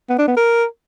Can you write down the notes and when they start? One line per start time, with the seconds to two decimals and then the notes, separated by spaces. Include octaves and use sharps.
0.10 B3
0.19 D4
0.28 B3
0.37 A#4